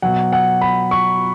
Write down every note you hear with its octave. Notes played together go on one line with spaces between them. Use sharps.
B2 F#3 F#5
F#5
B5
C#6